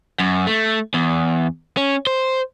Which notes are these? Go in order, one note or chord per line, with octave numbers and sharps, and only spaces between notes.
F#2
A3
E2
C#4
C5